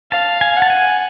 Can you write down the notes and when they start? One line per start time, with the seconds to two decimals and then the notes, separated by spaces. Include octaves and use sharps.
0.12 F5 A5
0.41 G#5
0.56 F#5
0.62 A5
0.70 G#5